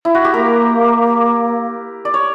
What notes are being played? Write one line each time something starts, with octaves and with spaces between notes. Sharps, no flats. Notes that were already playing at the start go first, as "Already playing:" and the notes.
E4
F#4
G4
A#3 A#4
D5
C#5